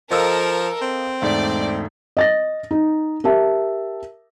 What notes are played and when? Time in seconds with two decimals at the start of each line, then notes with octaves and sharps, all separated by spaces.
0.11 F3 A4 A#4 D#5 F5 E6
0.82 C4
1.22 E1 G#2 A3 D5
2.17 D#5 A6 A#6
2.71 D#4
3.24 G4 A#4 E5 A5